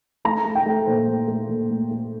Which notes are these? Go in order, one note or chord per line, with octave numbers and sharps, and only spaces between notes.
A3 A#5
A3
G5
A3
A#2 C5
A3
A3
A#2
A3
A3